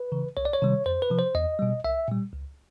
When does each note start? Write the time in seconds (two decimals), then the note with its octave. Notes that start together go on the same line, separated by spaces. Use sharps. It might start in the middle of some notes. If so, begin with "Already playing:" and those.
Already playing: B4
0.12 C#3 E3
0.37 C2 C#5
0.45 D5
0.53 C#5
0.62 C3 D#3 G3
0.86 F2 C5
1.02 B4
1.11 C3 F3
1.19 C5
1.35 E2 D#5
1.59 B2 G3
1.83 C2 E5
2.08 A#2 G3
2.33 C#2